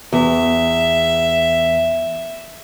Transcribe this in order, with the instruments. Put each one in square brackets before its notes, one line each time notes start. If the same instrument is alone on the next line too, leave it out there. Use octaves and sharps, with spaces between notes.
[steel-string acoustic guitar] E2 [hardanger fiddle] E5